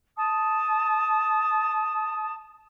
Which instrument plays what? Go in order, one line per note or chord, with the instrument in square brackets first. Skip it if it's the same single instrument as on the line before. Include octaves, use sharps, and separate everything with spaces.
[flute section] A5 D#6